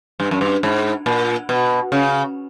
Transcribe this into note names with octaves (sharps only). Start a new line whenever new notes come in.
G2
F#2
G2
G#2
A#2
B2
C#3